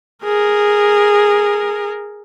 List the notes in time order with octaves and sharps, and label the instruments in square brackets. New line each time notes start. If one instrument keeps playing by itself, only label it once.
[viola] G#4 A#4